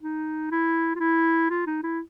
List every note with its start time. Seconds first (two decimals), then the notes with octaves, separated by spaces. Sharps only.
0.02 D#4
0.51 E4
0.95 F4
1.00 E4
1.50 F4
1.66 D#4
1.83 E4